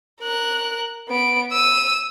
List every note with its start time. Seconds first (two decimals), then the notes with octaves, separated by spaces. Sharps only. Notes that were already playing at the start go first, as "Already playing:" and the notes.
0.21 A#4 F#6
1.09 B3 D7
1.52 E6 D#7